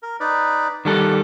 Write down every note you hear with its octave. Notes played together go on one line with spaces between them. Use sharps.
A#4
D#4 B4 D5
D#3 G3 A4 F#5 D6